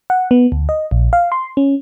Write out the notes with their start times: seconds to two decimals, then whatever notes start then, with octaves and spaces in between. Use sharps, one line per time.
0.10 F#5
0.31 B3
0.52 D2
0.69 D#5
0.91 A#1
1.13 F5
1.32 C6
1.57 C#4